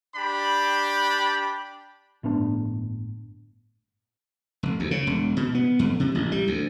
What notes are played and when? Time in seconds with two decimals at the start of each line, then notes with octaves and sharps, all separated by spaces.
0.14 D4 G4 B5
2.23 G1 A2 B3 D4
4.63 F1
4.80 D2
4.91 C#3
5.07 E1
5.37 B2
5.55 B3
5.79 F2
6.00 C3
6.15 A1
6.32 G3
6.47 D2